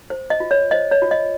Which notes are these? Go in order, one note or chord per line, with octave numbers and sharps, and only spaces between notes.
C5
D#5
F4
C#5
C5 D#5
C#5
F4
D#5